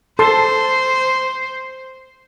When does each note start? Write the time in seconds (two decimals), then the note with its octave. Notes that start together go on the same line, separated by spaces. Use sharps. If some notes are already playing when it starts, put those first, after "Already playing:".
0.19 A4 C5 A5 C6